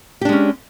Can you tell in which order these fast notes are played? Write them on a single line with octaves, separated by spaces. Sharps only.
G4 D4 G#3 C#4